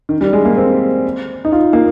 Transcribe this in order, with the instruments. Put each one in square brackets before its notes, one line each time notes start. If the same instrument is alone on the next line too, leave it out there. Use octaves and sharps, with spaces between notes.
[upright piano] D#3
G3
G#3
A#3
C4
D#4
F4
A#3